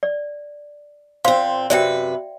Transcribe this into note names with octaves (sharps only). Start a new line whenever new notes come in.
D5
A#2 C4 C5 F5 C6
F#2 C3 B4 D5 E5 G5